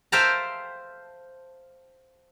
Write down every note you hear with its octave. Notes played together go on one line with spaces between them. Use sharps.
C5 E5 F5 G5 A5 A#5